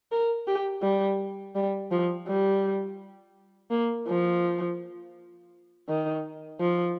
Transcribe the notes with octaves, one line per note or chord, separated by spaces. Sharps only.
A#4
G4
G3
G3
F3
G3
A#3
F3
D#3
F3